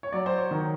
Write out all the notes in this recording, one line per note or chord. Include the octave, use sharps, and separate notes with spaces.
C#5
F#3 D5
C5
C#5
D#3